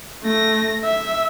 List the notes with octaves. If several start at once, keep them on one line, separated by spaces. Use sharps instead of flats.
A3 A#6
E5